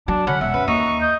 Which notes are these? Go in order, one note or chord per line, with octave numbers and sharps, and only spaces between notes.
F#3 D4 A5
D3 C#4 F#5 B5
E1 E5 F#5
F#2 B4
D#2 D#4 C#6
D#5 G6